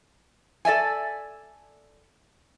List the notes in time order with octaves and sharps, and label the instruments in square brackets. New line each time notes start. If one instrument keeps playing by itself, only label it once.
[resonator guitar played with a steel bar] A4 D5 E5 G#5